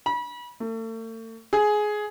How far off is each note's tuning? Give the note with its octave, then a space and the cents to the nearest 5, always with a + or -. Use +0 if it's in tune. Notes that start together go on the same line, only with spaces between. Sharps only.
B5 -30
A3 +40
G#4 +15